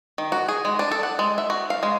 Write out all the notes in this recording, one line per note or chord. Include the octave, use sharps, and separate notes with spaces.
D#3
F#4
G#4
G#3
D4
A4
F#5
G#3
E5
F#4
F5
G#3